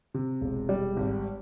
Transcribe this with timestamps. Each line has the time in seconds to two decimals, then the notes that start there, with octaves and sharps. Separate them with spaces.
0.14 C3
0.41 E1
0.69 G3
0.97 G#1